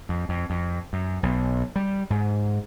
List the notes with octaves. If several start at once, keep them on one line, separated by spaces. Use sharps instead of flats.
F2
F2
F2
F#2
B1
G3
G#2